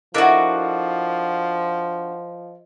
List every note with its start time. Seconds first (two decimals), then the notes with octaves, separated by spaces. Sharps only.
0.15 F3 D4 E4 F#4 A4 A#4 D#5